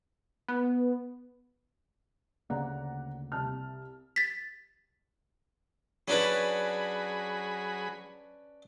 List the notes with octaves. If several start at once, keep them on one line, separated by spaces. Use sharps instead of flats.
B3
D2 C#3 A#3 D5 F#5 A#5
C2 A5 F6
A6 B6
F#3 C#4 D4 G#4 B4 B5